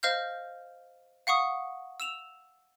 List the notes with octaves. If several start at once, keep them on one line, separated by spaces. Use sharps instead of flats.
C5 D#5 F5 F6 G6
F5 F#5 C#6 D#6
E6 E7 F7